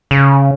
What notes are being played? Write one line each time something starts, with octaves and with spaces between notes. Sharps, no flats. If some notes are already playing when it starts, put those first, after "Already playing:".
C#3